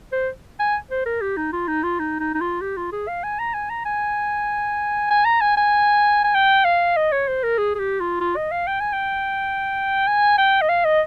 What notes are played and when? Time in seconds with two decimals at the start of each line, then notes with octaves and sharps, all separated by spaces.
0.12 C5
0.60 G#5
0.91 C5
1.06 A#4
1.21 G4
1.37 D#4
1.53 F4
1.68 D#4
1.83 F4
1.99 D#4
2.20 D#4
2.34 D#4
2.40 F4
2.61 G4
2.77 F4
2.92 G#4
3.08 F5
3.24 G#5
3.39 A#5
3.54 G#5
3.70 A#5
3.85 G#5
5.10 G#5
5.25 A#5
5.41 G#5
5.57 G#5
6.24 G#5
6.34 G5
6.65 F5
6.97 D#5
7.12 C#5
7.28 C5
7.43 A#4
7.58 G#4
7.75 G#4
7.79 G4
8.00 F4
8.21 F4
8.36 D#5
8.52 F5
8.67 G5
8.80 G#5
8.93 G5
10.07 G#5
10.38 G5
10.62 D#5
10.69 F5
10.85 D#5